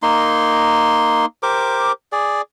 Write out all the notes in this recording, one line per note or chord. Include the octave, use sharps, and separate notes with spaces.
A#3 D#4 C6
G4 A#4 C5 D6
G#4 D5